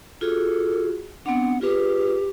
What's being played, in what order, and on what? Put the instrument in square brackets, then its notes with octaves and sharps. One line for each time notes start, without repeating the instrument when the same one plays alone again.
[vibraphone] F4 F#4 G#4 [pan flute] A4
[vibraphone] B3 C4 D4 [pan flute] F#5
[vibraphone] F4 G#4 B4 [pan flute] G4